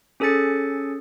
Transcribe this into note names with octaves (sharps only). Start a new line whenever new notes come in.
C#4 G#4 A4 G#5 A6 C#7